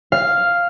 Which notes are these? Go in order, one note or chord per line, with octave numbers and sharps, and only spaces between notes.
F5